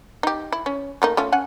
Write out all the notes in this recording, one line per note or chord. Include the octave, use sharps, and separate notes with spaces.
D#4 G4
E4
C#4
A3 A#3 D#4
A3 C#4 F4
C#4 F#5 G#5